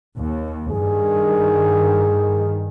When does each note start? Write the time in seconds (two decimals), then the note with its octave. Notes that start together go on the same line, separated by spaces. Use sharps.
0.16 D#2
0.71 G2 D#3 G#4